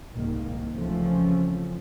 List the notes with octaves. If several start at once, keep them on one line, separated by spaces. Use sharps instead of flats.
C2 G#2 D#3 A#3
C#2 E3 F3 A3 C4 C#4